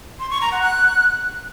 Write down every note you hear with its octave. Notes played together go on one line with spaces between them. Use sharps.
C6
C#6
A#5
F#5
F#6